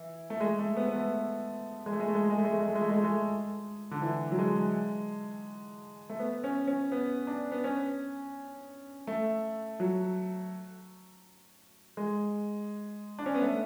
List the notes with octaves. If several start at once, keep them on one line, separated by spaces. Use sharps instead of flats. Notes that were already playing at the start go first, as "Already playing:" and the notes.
Already playing: E3
A3
G#3
A3
B3
B3
A3
G#3
A3
G#3
A3
G#3
A3
G#3
A3
G#3
A3
G#3
A3
G#3
A3
G#3
A3
G#3
D3
E3
F#3
G#3
A3
B3
C#4
C#4
B3
D4
B3
C#4
A3
F#3
G#3
D4
C#4
B3
A3